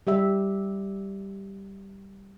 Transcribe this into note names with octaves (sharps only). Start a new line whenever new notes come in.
G3 G4 E5